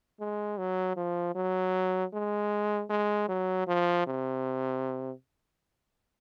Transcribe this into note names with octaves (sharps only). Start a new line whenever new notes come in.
G#3
F#3
F3
F#3
G#3
G#3
F#3
F3
C3